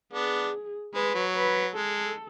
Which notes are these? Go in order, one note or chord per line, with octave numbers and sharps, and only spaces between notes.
B3 D4 G#4
G#3 B4
F#3
B4
G#3 A4